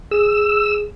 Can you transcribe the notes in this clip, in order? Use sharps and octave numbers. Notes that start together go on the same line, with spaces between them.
G#4 E6